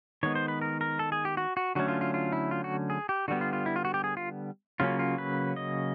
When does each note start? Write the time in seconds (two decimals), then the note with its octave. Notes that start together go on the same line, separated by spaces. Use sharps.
0.23 D#3 G#3 B3 C#5
0.35 C5
0.48 B4
0.62 A#4
0.81 A#4
0.99 A4
1.12 G#4
1.25 G4
1.37 F#4
1.57 F#4
1.75 D3 F#3 A3 C#4 F#4
1.88 F4
2.01 F4
2.14 F4
2.32 E4
2.51 F4
2.64 F#4
2.90 G#4
3.09 G4
3.28 D3 G3 B3 F#4
3.41 F4
3.53 F4
3.66 E4
3.76 F4
3.85 F#4
3.94 G4
4.04 G#4
4.17 F4
4.80 C#3 F#3 A#3 C#4 F4
4.99 F4
5.18 B4
5.56 D#5